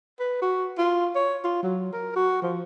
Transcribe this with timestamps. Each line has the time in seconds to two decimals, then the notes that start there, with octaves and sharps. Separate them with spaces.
0.20 B4
0.42 F#4
0.78 F4
1.15 C#5
1.44 F4
1.63 F#3
1.93 A#4
2.16 F#4
2.42 F3